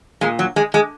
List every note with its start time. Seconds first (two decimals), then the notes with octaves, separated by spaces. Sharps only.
0.21 A#2 G#3
0.39 F#3
0.56 G#3
0.74 G#3